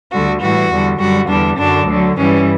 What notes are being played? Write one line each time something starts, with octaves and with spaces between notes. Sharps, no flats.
D2 D3 G3 F#4
A2 E3 G3 F#4
E2 D3 G3
F#2 D3 G3 F#4
E2 D3 G3 D4
F#2 D3 F#3 D4
D2 D3 F#3
G2 E3 G3 C#4